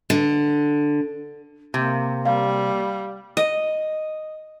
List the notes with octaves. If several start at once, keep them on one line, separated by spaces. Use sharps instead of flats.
D3
C3 A#3
G3 F5
D#5